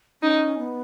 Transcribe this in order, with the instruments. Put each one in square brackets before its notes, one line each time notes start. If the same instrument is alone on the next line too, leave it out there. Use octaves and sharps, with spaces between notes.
[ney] C#4 [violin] D#4
[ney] B3